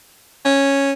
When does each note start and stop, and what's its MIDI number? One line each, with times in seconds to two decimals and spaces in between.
0.45 0.92 61